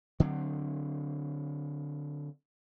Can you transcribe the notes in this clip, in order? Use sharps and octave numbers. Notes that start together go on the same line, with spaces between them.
D3 F#3 C4